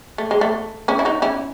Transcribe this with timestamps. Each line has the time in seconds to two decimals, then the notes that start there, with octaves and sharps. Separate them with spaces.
0.18 A3
0.31 G#3
0.41 A3
0.88 C#4 E4
0.99 E4
1.05 D#4 F#4
1.22 C#4 E4